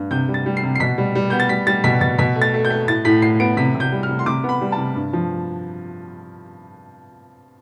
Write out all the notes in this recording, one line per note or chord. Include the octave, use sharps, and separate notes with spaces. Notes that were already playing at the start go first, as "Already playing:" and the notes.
Already playing: G2
C3 G6
G3
A6
G3
C7
C3
C7
B2 B6
G3
G3
B3 G6
A6
G3 B6
G3 A6
B2 B6
B2 A6
B2 B6
A3
A6
A3
G6
A3
A2 A6
A2 B6
A2 C7
B3 D7
C3 B6
C3
G6
G3
F6
C3
C6
C3 D6
B3
B5
G3
A5
C3
G2
F3